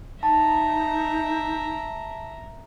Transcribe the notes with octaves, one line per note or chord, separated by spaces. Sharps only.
D#4 E5 A5 A#5